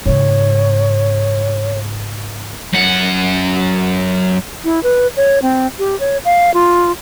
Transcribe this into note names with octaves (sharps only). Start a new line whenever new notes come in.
G#2 C#3 C#5
F#2 F#5
E4
B4
C#5
C4
G4
C#5
F5
F4